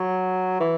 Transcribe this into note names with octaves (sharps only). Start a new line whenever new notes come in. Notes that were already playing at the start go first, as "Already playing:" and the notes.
Already playing: F#3
E3